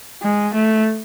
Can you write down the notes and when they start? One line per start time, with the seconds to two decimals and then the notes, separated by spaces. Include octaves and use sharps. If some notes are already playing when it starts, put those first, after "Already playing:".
0.23 G#3
0.54 A3